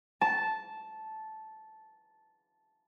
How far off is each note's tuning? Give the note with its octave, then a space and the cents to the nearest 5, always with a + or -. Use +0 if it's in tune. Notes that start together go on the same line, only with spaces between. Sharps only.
A5 -10